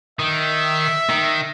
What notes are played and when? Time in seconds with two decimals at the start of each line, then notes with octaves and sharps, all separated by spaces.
0.19 D#3 E5
1.10 D#3